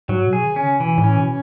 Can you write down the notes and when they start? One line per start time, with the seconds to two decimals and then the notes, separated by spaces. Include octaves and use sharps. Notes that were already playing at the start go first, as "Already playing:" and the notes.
0.09 G#2 F#3
0.27 B2
0.33 G#4
0.45 D#3
0.56 C#4
0.63 C#3
0.80 B2 E3
0.98 A2
1.04 C#4
1.16 B2